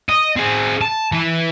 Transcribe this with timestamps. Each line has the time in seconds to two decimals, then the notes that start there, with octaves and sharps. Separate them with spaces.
0.09 D#5
0.36 C4 G#4
0.81 A5
1.12 E3 B4